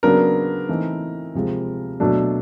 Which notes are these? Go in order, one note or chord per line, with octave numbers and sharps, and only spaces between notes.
C#3 F#3 B3 D4 A#4
E3 A3 C4 D#4
C3 F3 G#3
B2 F#3 A3 D4